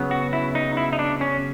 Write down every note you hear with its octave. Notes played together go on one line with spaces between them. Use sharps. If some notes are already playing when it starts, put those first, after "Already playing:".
Already playing: C#3 F#3 B3
F#4
E4
D#4
E4
D#4
D4
C#4